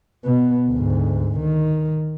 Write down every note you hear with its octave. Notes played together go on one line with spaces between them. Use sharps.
B2 B3
D2 G#2
D#3